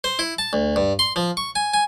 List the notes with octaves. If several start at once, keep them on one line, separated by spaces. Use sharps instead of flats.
C5
E4
A5
D2
G2
C6
F3
C#6
G#5
G#5